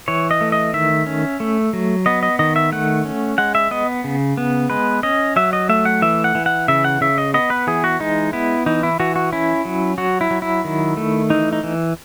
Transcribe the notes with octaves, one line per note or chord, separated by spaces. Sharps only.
E3 C#5
D#5
A3
D#5
D#3 E5
C#4
A3
F#3
B3 D#5
D#5
D#3 D#5
E5
A3 F#5
C#4
G#3 F#5
E5
B3 D#5
C#3
B3
G#3 B4
C#4 D#5
F#3 E5
D#5
A3 E5
F#5
E3 E5
F#5
E3
F#5
C#3 E5
F#5
C#3 E5
D#5
B3 D#5
B4
E3 G#4
F#4
G#3 D#4
B3 E4
E3 D#4
E4
E3 F#4
F#4
C#4 E4
F#3
F#3 F#4
E4
F#3
E4
D#3
A3
E3 D#4
D#4
E3